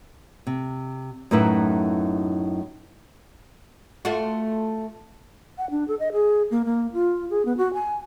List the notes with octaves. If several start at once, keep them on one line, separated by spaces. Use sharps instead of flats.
C3
F#2 A2 D#4 E4 B4 E5
A3 F4 F#4
F#5
D4
A4
D#5
G#4
A#3
A#3
F4
G#4
B3
F#4
G#5